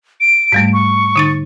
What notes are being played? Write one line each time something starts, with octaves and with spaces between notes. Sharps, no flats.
D7
G#2 G3 A3
C#6
D3 D#4 A6